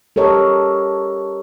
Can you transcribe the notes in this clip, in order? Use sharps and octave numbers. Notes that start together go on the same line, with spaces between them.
G4 A4 A#4 C#5 D#5